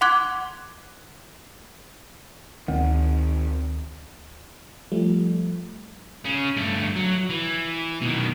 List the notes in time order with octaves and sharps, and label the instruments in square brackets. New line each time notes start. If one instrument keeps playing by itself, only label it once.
[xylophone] F#5 C6 D6 F#6 G#6
[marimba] D2 [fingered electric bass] D#3 C4
[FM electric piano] F3 G3 A3
[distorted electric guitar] C#3 C#4
G2 A3
F#3
E3
B2 D#3